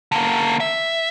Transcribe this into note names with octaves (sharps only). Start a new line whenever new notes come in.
D3 A#3
E5